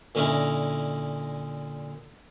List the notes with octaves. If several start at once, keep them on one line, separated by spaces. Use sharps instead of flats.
A#2 D3 C#4 D#4 E4 A#4